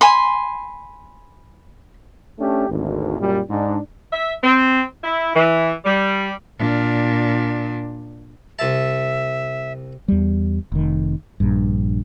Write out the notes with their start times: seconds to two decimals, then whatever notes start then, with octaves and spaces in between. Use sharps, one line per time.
0.01 G#5 B5 C6
2.39 A3 C#4 D4 G4
2.69 G#1 D2
3.19 F#2 A#2 G3
3.50 G#2 D4
4.13 E5
4.44 C4
5.04 E4
5.35 E3
5.85 G3
6.58 A#2 D4
8.59 C2 E5 A5
10.08 E2 G3
10.72 F1 D#3
11.40 A#1 G2